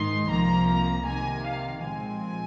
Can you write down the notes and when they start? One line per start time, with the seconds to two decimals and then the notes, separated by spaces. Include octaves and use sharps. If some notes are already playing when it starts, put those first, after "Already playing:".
Already playing: G#2 D#3 G#3 D#4 C6
0.30 C2 C3 F3 A#3 A#5
1.06 C3 D#3 A#3 G#5
1.45 F5
1.83 A#2 F3 G#3 C4 G#5